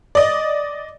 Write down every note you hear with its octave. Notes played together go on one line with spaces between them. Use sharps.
D5 D#5